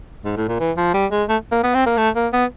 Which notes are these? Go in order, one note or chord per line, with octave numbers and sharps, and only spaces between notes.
G#2
A2
A#2
E3
F3
G3
G#3
A3
A#3
B3
C4
A#3
A3
A#3
B3